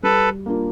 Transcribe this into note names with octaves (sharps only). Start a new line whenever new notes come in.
G3 A4 B4
A#3 D4 F4 A#4